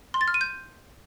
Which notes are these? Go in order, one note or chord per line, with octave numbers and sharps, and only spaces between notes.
C6
A6
F6
D#7
G6